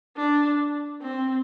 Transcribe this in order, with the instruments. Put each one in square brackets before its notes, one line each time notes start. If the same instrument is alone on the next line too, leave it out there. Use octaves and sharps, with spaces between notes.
[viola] D4
C4